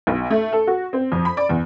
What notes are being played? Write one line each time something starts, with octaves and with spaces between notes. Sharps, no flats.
B1
A3
A4
F#4
C4
F2
B5
D5
E2